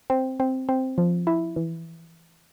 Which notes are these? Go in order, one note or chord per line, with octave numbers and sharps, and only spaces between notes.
C4
C4
C4
F3
E4
E3